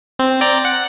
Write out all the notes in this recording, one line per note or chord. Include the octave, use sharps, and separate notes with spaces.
C4
D5 G5 A#5
F#5